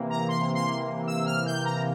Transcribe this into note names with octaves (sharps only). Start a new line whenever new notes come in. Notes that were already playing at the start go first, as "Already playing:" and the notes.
Already playing: C3 E3 A#3
A#5
C6
C6
E6
F6
G6
A#5